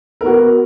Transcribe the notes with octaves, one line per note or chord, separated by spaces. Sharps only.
B3 F#4 A#4